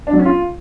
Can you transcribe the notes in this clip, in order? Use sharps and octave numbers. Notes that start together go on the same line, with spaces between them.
D4
F#3
C#4
F4